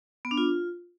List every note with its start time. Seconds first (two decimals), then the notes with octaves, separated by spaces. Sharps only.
0.25 B3
0.31 D4
0.37 F4